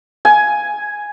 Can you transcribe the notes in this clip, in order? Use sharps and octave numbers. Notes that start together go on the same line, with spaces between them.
G#5